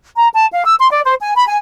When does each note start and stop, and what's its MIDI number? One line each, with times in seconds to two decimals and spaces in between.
0.16 0.28 82
0.34 0.45 81
0.53 0.65 77
0.65 0.74 88
0.79 0.90 84
0.92 1.02 74
1.05 1.15 72
1.20 1.34 80
1.36 1.47 83
1.48 1.57 80